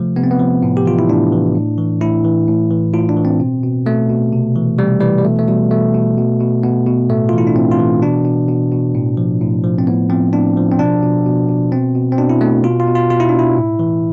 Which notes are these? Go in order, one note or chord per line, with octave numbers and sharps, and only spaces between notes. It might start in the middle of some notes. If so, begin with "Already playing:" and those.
Already playing: C3 F3 A3
C3 B3
C4
B3
F3
A2
G4
E3 F4
E4
A2 D4
E3
A2
E3
A2 E4
E3
A2
E3
A2 F4
D4
E3
C4
B2
B2
B2 A3
B2
C3
E3
C3 G3
E3 G3
G3
B2 A3
A3
B2 G3
B2 A3
B2
B2
B2
B2 B3
B2
A2 A3
E3 F4
E4
D4
A2 C4
F4
E3
B2 D4
B2
B2
B2
A2
F3
A2
F3
C4
A2 B3
F3 C4
A2 D4
F3
C4
B2 D4
B2
B2
B2
B2 C4
B2
C4
B2 D4
E4
B2 A3
B2 F4
F4
B2
F4
B2 F4
E4
D4
B2
E4
A2
E3